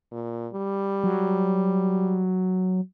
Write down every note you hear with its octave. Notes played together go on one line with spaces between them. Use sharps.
A#2
G3
F#3